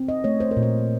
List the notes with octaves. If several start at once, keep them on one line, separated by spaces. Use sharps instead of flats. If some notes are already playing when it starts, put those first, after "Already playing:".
Already playing: C4
D#5
A3 C#5
C5
A#4
A#2
C5